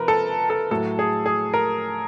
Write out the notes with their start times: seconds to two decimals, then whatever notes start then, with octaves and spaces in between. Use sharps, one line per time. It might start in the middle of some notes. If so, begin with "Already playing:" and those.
Already playing: C3 F3 A#4 B4
0.08 A4
0.50 A4
0.71 A2 F#3 A4
0.99 G#4
1.26 G#4
1.54 A#4